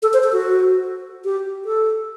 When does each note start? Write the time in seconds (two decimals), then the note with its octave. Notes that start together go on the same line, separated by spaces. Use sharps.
0.03 A4
0.13 C5
0.24 A4
0.33 F#4
1.25 G4
1.65 A4